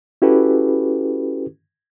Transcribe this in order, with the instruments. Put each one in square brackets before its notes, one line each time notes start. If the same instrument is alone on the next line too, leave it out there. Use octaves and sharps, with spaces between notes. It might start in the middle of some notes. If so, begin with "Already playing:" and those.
[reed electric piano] C#4 E4 F#4 G4 A4 B4